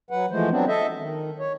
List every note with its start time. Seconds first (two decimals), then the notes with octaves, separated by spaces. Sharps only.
0.11 F#3 B4 F#5
0.31 E3 F3 G#3 A3 C5
0.50 F#3 B3 C4 D4
0.68 A4 D#5 E5
0.99 D#3
1.39 C#5